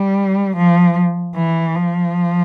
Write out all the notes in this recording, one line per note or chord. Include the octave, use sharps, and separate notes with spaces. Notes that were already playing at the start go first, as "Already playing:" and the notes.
Already playing: G3
F3
E3
F3